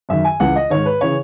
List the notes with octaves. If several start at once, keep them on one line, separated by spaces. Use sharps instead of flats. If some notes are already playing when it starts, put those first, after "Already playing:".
F#2 D#3 E5
G#5
C#2 C#3 E3 F#5
D#5
G#2 D#3 C#5
B4
C#3 E3 C#5